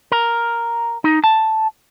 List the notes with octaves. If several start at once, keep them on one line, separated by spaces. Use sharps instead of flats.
A#4
D#4
A5